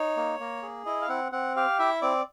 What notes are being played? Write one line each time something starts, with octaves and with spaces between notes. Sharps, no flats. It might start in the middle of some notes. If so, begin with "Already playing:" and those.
Already playing: D#4 C#5
A#3
A#3
G#4
E4 D#5
F5
C4 F#5
C4 F#5
G4 F5
E4 E5
C4 D5